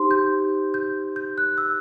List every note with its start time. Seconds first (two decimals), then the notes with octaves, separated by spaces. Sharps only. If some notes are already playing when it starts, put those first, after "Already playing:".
Already playing: D#4 G4 C5 C6
0.11 G6
0.74 G6
1.16 G6
1.38 F#6
1.58 E6